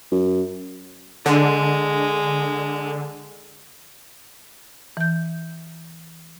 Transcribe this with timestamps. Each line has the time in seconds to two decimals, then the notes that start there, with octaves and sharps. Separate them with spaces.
0.12 F#2
1.26 D3 G#3
4.97 E3 G6